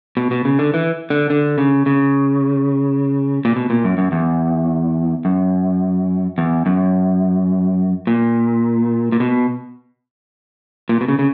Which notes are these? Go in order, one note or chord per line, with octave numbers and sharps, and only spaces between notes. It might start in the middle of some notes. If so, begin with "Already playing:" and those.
B2
B2
C#3
D3
E3
D3
D3
C#3
C#3
A#2
B2
A#2
F#2
F#2
E2
F#2
E2
F#2
A#2
A#2
B2
A#2
B2
C#3
C#3